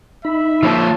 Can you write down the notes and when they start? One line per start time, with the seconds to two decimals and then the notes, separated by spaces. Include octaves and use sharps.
0.25 D#4 E5 B5
0.63 F3 A#3 F4 C#5 A5